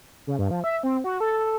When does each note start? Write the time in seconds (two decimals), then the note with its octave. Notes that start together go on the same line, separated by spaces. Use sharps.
0.27 C#3
0.39 G2
0.51 F3
0.64 E5
0.83 C4
1.04 F#4
1.20 A4